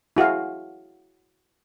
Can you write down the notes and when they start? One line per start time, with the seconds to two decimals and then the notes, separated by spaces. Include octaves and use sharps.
0.17 E4 F#4 G#4 F5